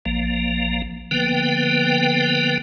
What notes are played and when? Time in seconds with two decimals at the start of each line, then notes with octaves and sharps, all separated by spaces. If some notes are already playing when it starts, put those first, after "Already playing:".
0.05 A#1 F3 A#3
1.11 D3 F3 A#3 B3 B4 G5